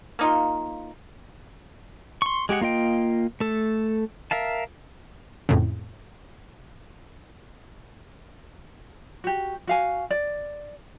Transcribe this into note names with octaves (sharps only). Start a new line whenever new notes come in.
A#3 D#4 F4
C6 C#6
G#3 G4 G#4 F#5
A#3 F4 D#5 G5
A3 A4
A#4 E5 F5 A5
F2 A2 C#3
F#4 G4
F#4 F5 G#5
D5